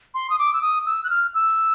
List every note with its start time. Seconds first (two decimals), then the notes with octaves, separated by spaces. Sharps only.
0.14 C6
0.30 D#6
0.39 D6
0.53 E6
0.62 D#6
0.86 E6
1.04 F#6
1.10 F6
1.34 E6